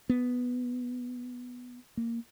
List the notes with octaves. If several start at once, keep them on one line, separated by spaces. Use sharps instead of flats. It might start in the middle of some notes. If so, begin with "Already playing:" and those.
B3
A#3